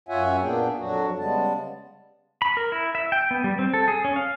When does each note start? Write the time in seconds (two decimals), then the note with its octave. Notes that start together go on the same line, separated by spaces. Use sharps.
0.09 F#2 F4 C#5 E5 F#5 G#5
0.42 A#2 A#3 B3 D4 G#4 G5
0.79 F2 F#3 D4 F#4
1.19 C#3 G3 G#3 B3 A5
2.42 B5
2.57 A#4
2.72 E4
2.95 E5
3.12 G5
3.31 B3
3.44 G3
3.59 C4
3.74 A4
3.88 G#4
4.05 C#4
4.16 F5